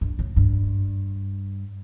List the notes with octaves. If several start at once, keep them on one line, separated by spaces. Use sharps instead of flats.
G2
A2
G2